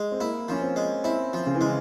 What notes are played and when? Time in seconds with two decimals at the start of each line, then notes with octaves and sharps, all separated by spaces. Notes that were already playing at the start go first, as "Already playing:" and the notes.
Already playing: G#3
0.12 C4
0.20 A#3 E4
0.48 F3 C#4
0.62 C4
0.76 G#3
1.04 C4 E4
1.33 F3
1.46 C#3
1.55 E3
1.61 C#3 G#3